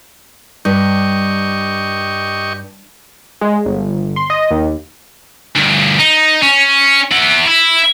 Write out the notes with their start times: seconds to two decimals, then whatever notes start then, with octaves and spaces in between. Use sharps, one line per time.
0.65 G2 G4 D#5 C#6
3.41 G#3
3.65 G1
4.16 C6
4.30 D#5
4.51 D#2
5.55 D2 G2
5.99 D#4
6.42 C#4
7.12 E4 F#5
7.47 E4